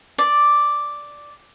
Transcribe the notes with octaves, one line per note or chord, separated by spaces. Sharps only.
D5